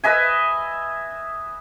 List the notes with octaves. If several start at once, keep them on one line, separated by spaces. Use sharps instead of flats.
B4 D#5 E5 G#5